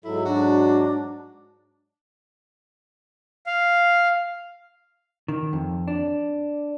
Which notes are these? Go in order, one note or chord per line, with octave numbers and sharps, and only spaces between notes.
G#2 F#3 E4 A4
D4 F#4
F5
D#3
F2
D4